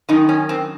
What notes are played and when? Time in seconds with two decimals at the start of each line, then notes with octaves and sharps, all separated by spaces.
0.09 F#2 D#3 D#4
0.29 C#4
0.49 C4